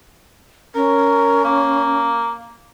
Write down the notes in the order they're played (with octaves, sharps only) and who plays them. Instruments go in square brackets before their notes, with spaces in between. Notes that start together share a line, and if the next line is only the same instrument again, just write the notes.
[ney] C#4 [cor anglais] A#4
[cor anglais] A#3